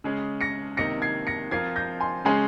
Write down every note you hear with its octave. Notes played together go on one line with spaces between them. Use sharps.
C#3 G#3 C#4 G#4
A#6 C#7
C3 D#3 A#3 D#4 A#6 C#7
G#6 C7
A#6 C#7
F3 C4 F4 A#4 G#6 C7
G6 A#6
G#5 C6
C#3 G#3 C#4 G#4 G#5 C6